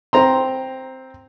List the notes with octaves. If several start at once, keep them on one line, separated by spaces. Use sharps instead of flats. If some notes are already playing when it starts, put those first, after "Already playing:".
C4 A#5 C6